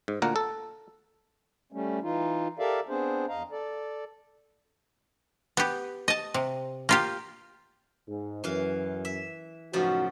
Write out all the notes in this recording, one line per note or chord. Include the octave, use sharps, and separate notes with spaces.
G#2
D2 A#2 A#3 A#4 F#5
A4
G3 A3 C#4
E3 D#4 F4
G4 A4 A#4 D5 E5 F5
B3 C4 D4 G#4 C5
E2 D#5 F5 A#5
A4 D5
B3 G4
D#5 A5
C3
A#3 F4 G4
G#2
F#2 E3 F5
E5
F#2 A2 C#3 F3 D#4 F#4